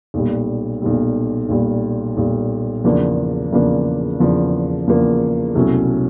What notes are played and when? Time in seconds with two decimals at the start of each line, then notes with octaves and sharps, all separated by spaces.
0.14 B1 A#2 G3
0.82 B1 A#2 G3
1.49 B1 A#2 G3
2.17 B1 A#2 G3
2.84 E2 C#3 F3 A#3 D4
3.52 E2 C#3 F3 A#3 D4
4.20 E2 C#3 F3 A#3 D4
4.87 E2 C#3 F3 A#3 D4
5.55 C2 B2 F#3 A3 C#4